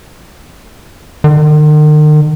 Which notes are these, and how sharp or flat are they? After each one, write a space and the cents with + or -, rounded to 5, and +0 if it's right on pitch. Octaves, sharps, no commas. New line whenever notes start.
D#3 -45